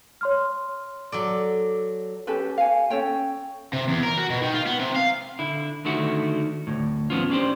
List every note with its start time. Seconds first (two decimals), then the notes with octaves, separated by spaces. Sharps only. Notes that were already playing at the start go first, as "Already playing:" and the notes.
0.21 C#5 C6 F6
1.12 F#3 A4 D5
2.27 C#4 G4 A4 B4
2.58 F5 G#5
2.90 C#4 A4 C#5 G5
3.73 C3
3.88 E2
4.03 A#4
4.17 F#4
4.30 B2
4.42 D#3
4.54 F4
4.66 B3
4.79 C3
4.96 F5
5.39 D3 E4
5.85 D3 D#3 A3 E4 F#4
6.67 D2 A2
7.10 F3 B3 C#4 F4
7.30 C#4 D4 G4 C5